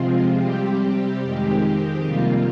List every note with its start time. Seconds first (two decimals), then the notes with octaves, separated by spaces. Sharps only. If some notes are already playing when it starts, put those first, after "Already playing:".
Already playing: C3 F3 G#3 C4 F4
0.38 C3 G3 C4 G4
1.22 F2 D#3 G#3 C4
2.05 F2 C3 G3 A#3 F4